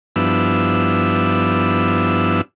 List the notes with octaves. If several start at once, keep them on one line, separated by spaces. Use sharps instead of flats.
G2 F3 B3 D4 E4 E6